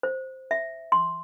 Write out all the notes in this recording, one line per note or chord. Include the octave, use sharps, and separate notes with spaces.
C5
E5
C6